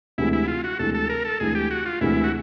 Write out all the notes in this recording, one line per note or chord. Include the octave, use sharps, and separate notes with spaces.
D2 C3 E3 G#3 E4
E4
F4
F#4
D2 C3 E3 G#3 A4
A4
A#4
A4
D2 C3 E3 G#3 G#4
G4
F#4
F4
D2 C3 E3 G#3 E4
F#4